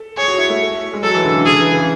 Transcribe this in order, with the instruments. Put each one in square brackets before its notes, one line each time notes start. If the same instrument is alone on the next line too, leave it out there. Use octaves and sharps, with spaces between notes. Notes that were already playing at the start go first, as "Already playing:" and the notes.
Already playing: [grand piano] A4
[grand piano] G#4 [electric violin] C#5
[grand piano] F#4
E4
A3
G#3
[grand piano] F#3 [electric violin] A4
[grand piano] E3
D3
C#3
[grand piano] D3 [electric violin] G#4
[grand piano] E3
C#3